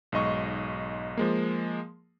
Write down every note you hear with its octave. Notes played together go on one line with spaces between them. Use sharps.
B1 G#2 D#5 C#6
F3 G#3 A#3